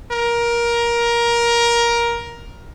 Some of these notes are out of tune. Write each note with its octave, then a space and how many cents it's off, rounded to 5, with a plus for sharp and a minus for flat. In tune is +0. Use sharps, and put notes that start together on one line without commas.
A#4 +15